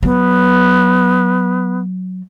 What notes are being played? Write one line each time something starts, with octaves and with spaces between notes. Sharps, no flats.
F#3 B3